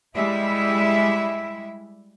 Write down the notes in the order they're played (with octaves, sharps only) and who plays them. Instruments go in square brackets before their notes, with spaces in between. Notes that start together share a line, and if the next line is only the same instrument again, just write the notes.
[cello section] G3 G#3 E4 E5